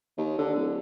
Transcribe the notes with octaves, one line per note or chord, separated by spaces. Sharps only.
D#2
D3
D1